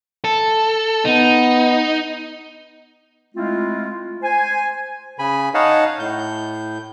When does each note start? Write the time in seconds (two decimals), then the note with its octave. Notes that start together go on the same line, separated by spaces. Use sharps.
0.24 A4
1.05 B3 D#4
3.35 G#3 A3 C4 E4 F4
4.22 C5 G#5
5.19 C#3 G#5 B5
5.54 D#4 C#5 D#5 F5 F#5 A5
5.99 A2 G6